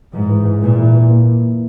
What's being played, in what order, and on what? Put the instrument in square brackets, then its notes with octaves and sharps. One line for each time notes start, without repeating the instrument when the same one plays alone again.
[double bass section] G#2 [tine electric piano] E3
[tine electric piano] E3
E3
[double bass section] A#2 [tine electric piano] E3
[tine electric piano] E4
E3
A#3